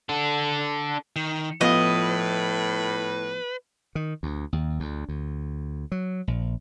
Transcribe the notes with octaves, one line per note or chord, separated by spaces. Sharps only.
D4 A4
D#3
A2 F3 B3 F4 B4 D#5
D#3
D2
D#2
D2
D2
F#3
A#1